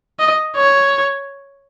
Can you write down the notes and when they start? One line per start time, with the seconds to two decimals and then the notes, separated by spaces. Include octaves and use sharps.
0.19 D#5
0.56 C#5